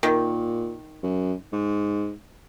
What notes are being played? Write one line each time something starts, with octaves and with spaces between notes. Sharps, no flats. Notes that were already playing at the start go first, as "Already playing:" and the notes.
A#2 D#3
F#2
G#2